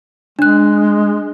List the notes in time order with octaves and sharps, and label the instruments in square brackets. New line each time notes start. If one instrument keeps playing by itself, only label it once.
[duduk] G#3 [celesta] D4 F#6